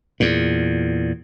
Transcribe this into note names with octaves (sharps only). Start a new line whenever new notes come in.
E2 A#2